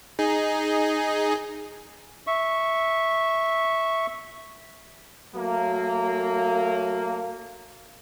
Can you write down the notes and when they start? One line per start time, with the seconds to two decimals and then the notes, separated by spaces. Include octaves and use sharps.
0.19 D#4 G#4
2.27 E5 C#6
5.34 F#3 A3 A#3